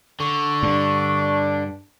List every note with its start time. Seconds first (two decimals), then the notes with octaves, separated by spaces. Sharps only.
0.20 D3 C#6
0.63 G2 D4